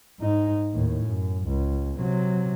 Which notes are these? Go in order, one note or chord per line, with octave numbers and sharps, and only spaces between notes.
G#2 D#4
D#2 A2
F#2
C#2
C3 F#3